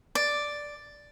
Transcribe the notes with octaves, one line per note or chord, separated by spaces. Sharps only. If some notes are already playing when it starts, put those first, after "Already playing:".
D5